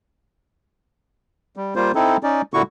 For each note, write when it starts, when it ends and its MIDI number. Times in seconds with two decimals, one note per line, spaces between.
1.57 1.74 55
1.76 1.92 55
1.76 1.92 58
1.76 1.92 65
1.76 1.92 72
1.95 2.17 60
1.95 2.17 63
1.95 2.17 64
1.95 2.17 69
2.23 2.42 61
2.23 2.42 63
2.23 2.42 74
2.54 2.62 46
2.54 2.62 50
2.54 2.62 64
2.54 2.62 66
2.54 2.62 85